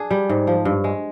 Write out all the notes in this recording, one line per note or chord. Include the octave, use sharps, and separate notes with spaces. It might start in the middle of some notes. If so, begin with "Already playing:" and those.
Already playing: D4 G#4
G3
G#2
F3
G2
G#3